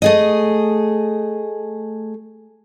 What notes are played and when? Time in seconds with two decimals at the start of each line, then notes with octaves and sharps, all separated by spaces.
0.02 A3 G#4 D#5